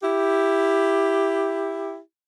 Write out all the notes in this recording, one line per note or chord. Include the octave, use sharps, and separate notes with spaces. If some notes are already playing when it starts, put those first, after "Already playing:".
E4 G4